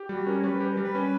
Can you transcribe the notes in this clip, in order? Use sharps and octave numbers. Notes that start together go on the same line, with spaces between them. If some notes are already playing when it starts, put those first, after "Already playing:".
Already playing: G4
G3 F#4
C#4 A#4
C#5
G3 B4
G4 B4
A#4
G3
B4
C#4